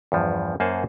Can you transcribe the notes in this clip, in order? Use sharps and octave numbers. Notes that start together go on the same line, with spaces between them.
E2 G2 F3
F#2 A#3 C5 F#5 G#5 A5